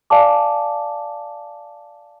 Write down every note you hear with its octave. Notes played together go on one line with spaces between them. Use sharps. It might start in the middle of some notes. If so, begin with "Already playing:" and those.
D5 F5 G#5 A5 D6